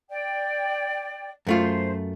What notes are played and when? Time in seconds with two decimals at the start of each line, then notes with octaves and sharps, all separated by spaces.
0.09 D5 G5
1.47 F#2 A3 F4 C5